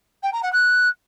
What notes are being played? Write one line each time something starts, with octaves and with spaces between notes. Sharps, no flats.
G5
A#5
F#5
F#6